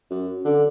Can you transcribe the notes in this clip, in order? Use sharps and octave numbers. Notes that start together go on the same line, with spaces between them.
F#2
D3